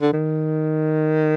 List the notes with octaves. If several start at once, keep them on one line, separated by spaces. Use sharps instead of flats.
D3
D#3